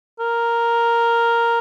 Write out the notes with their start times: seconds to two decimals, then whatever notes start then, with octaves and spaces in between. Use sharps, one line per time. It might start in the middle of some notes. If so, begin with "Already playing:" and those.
0.20 A#4